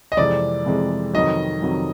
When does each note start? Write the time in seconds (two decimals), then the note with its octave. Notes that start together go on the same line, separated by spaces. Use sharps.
0.12 D#5
0.17 F2 C3 E3 G#3 D5
0.66 F2 C3 E3 G#3
1.14 F2 C3 D#3 F#3 D#5
1.62 F2 C3 D#3 F#3